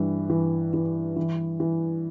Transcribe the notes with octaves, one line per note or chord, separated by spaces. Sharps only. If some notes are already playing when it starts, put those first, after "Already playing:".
Already playing: G2 E3
E3
E3
E3
E3